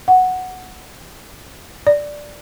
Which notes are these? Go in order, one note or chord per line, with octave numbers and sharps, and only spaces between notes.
F#5
D5